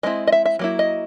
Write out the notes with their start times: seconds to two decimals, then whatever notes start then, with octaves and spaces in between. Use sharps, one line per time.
0.03 G#3 C4 E4 D#5
0.27 D#5
0.32 E5
0.46 E5
0.59 F#3 A#3 E4
0.79 D#5